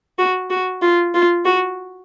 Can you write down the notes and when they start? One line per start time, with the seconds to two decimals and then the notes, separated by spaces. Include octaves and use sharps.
0.19 F#4
0.50 F#4
0.82 F4
1.14 F4
1.45 F#4